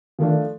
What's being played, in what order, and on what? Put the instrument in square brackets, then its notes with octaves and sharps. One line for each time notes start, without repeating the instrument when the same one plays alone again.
[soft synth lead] D#3 [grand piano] F3 A3 D4